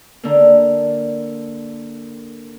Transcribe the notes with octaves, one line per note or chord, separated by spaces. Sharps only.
D3 A#3